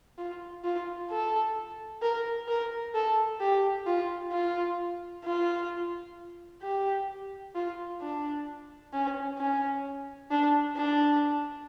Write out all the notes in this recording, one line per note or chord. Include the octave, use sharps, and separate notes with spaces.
F4
F4
A4
A#4
A#4
A4
G4
F4
F4
F4
G4
F4
D4
C#4
C#4
D4
D4